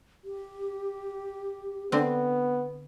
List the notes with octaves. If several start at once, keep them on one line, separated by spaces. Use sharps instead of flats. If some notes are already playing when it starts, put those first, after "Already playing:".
G4
D3 B3 C4